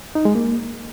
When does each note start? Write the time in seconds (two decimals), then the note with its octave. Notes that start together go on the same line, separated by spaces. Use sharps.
0.15 D#4
0.25 G#3
0.35 A#3